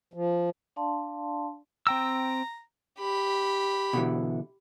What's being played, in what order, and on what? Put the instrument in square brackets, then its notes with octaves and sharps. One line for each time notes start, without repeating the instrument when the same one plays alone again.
[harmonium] F3
[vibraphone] D4 D5 F5 A5 C6
[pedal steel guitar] C4 G5 E6 [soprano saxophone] A#5
[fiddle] G4 B5
[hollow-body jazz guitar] B2 D3 E3